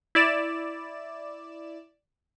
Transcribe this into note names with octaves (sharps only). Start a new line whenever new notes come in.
E4 D5 E7